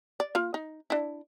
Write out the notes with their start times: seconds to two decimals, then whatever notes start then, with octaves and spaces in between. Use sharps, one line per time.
0.20 D5
0.35 A#3 F4 F5
0.54 D#4
0.90 D4 E4